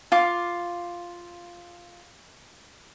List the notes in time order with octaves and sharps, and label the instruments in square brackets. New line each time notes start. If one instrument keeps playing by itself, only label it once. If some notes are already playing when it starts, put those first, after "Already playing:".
[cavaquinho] F4 F5 D6